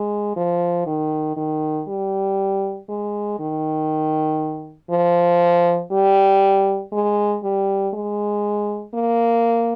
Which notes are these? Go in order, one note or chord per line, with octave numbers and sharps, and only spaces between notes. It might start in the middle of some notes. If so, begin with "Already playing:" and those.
Already playing: G#3
F3
D#3
D#3
G3
G#3
D#3
F3
G3
G#3
G3
G#3
A#3